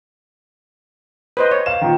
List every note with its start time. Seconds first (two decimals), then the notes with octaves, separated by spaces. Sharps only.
1.37 B4 C5 D#5
1.51 C#5
1.66 F5 E7
1.81 A#2 D#3